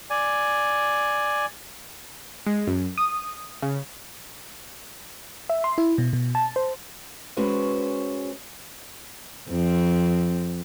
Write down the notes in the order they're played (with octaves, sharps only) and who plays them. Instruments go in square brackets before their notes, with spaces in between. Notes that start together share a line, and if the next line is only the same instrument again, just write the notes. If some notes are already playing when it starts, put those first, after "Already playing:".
[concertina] D5 G#5
[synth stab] G#3
F#2
D#6
C#3
[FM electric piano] E5
C6
E4
B2
B2
A5
C5
[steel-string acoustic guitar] G#3 C#4 F#4 B4 C5
[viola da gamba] F2 C4